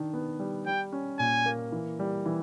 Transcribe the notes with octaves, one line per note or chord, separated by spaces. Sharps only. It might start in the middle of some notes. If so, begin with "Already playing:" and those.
Already playing: D#3 D4
B3
G3
G3 G5
C#4
A#2 G#5
A#3
E3
G3
E3